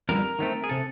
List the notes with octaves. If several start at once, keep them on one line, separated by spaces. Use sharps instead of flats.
F2 D3 G3 A#4
D#3 F#3 A3 C4
G#4
C3 A4